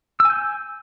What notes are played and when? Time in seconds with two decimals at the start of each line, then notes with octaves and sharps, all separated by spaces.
0.20 E6
0.25 G#5
0.30 G6